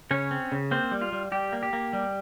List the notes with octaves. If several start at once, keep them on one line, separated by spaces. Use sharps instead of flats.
C#3 C#4 C#5
C4
C#3
A#3 C4 C5
G3
F4
G3
G3 G4
A#3
G4
A#3
G3